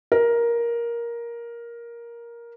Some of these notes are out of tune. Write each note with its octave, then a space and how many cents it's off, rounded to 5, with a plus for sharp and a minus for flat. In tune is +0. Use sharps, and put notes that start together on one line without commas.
A#4 +10